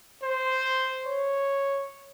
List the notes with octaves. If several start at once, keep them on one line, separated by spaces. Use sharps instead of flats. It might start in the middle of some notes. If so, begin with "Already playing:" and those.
C5
C#5